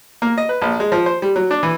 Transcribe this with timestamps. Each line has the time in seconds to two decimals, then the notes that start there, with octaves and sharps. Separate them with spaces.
0.22 A#3
0.38 D#5
0.49 B4
0.61 A#1
0.80 G#3
0.92 F3
1.06 C5
1.22 G3
1.36 F#3
1.51 D4
1.63 E3